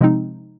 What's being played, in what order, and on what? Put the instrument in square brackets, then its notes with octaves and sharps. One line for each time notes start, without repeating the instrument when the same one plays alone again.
[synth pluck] C3 F3 G#3 C4 D#4